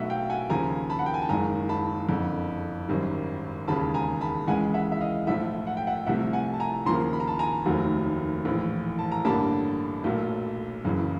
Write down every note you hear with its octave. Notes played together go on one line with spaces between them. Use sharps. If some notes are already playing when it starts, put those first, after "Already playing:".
Already playing: B1 B2 F#3 A3 E5 F#5
F5 G5
F#5 G#5
D#2 C#3 F3 G#5 A#5
A5 B5
F#5
G5
G#5
A5
F#1 F#2 D#3 G#3 G#5 A#5
A5 B5
F#1 F2 D3
G#1 F#2 D#3 G3
E1 D#2 C#3 A5 B5
G#5 A#5
A5 B5
C#2 C#3 E3 G#3 F#5 G#5
E5 F#5
E5
D#5 F5
B1 A2 F3 A3 E5 F#5
F#5
G5
E5 F#5
C2 C3 F3 A3 E5 F#5
F#5 G#5
A5
G#5 A#5
D#2 C#3 F3 A#3 A#5 C6
B5
A#5
A5 B5
G#5 A#5
F1 D#2 D#3 F#3 A3
A#1 A2 E3
A5
A#5
A1 G2 D3 G3 A#3 A5 B5
B1 A#2 F#3 A3
F#1 F#2 C#3 E3